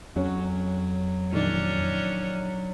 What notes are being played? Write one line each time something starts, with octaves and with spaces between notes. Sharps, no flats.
F2 F#3 C#4
A#1 D#3 C#4 D4